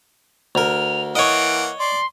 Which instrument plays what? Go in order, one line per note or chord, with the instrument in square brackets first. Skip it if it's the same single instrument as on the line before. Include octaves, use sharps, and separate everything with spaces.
[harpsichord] D2 A#4 [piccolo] F7
[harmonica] E3 A#3 F#5 [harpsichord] C#5 D#5 [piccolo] D7
[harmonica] D5 [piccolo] C6